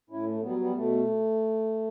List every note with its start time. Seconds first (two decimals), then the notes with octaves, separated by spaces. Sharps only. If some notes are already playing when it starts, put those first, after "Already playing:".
0.10 A2 C#4 E4
0.26 A3
0.42 F#3 G3 B3
0.58 G3 B3
0.74 B2 A3